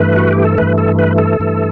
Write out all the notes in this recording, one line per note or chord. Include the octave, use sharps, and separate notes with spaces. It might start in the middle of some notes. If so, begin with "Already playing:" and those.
Already playing: G2 E3 A3 B4
F#4
G4
A4
G2 E3 A3 B4
A4
B4
A4
G2 E3 A3